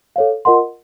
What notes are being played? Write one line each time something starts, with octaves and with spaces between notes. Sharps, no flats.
A4 C#5 F5
F4 A#4 D#5 F#5 C6